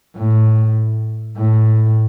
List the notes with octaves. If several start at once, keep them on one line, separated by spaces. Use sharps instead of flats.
A2
A2